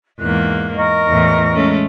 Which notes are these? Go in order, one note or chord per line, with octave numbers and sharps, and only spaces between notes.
E2 G#2 A#3 F#6
A#4 D#5 C#6
E2 A2
G#3 A3 C#4